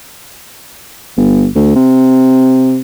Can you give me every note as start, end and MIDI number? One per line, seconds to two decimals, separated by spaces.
1.17 1.46 31
1.55 1.72 38
1.75 2.81 48